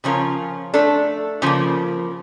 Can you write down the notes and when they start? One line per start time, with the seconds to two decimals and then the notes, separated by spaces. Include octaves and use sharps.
0.04 C#3 F3 C#4 F4 A#4
0.74 A3 D4 A4
1.42 C#3 F3 A#3